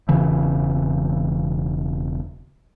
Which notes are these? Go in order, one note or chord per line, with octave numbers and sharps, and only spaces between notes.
E1 C#3 E3